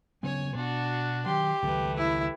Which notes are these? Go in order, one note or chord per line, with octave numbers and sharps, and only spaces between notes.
C#3 F#3 B3 C#5 G#5
B2 D4 F#4
D#3 F#3 G4 C6
C#2 D#3 F#3 A3 B4
E4